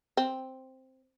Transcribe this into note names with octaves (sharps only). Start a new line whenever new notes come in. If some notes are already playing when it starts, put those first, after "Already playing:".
C4